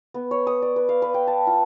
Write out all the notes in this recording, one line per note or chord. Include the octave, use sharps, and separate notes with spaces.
B3
C#5
D#6
D5
B4
F5
B4
G5
A5
F4